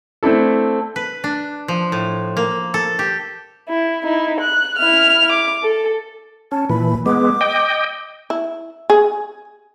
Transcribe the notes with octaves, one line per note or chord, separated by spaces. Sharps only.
A3 C4 D4 E4 A4
B4
D4
F3
A2
A#3
A4
G4
E4
D#4 E4
F#6
E4 F6
D6
A4
C#4 A5
A#2 E3 B5
G#3 B3 D6
D#5 G5
E4
G#4